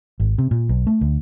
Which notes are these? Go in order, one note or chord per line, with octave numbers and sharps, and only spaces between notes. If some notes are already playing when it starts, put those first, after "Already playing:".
G#1
C3
A#2
B1
A3
D2